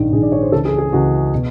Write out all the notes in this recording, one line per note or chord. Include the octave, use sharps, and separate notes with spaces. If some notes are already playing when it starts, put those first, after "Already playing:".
Already playing: A#1 G#2 D#3
A#1 G#2 D#3 G#4
D5
C#5
C5
C#2 C#3 E3 A4
G#4
G#4
C#2 C#3 E3 F#4
B2